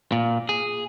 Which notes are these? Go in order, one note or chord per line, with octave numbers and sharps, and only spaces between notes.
A#2
G#4